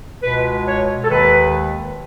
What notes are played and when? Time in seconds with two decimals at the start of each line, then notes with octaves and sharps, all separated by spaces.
0.22 C#2 B2 G#3 B4
0.66 C#5
1.04 A4
1.09 D#2 D#3 G#3 B4